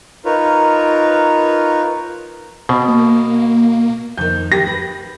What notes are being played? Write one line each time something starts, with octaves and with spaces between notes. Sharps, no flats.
D#4 F4 A#4 B4 C#5
B2 C4
A#3
A#3
F2 D#3 G6
G4 A#6
B4